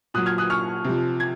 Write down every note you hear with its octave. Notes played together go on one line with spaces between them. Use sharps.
A#2 F#3 D#6 F#6
F6 G#6
D#6 F#6
C#6 F6
C3 F3
G#6